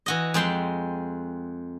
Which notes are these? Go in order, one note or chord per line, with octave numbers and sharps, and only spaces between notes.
E3 F#4 D#5
F2 G#3 G5 C6